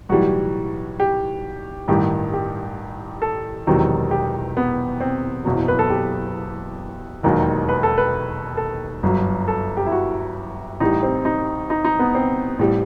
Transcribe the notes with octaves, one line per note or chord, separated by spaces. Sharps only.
B1 A2 E3 G3 F#4
G4
A1 G2 D#3 G3 G4
G4
A4
E1 E2 C3 D#3 F#3
G4
B3
C4
F#1 E2 B2 F#3
B4
A4
G4
E1 D#2 D#3 F#3
B4
A4
B4
A4
G1 F#2 F#3
A4
G4
E4
F#4
A1 A2 G3 D#4
C4
D#4
D#4
D#4
B3
C4
A1 A2 G3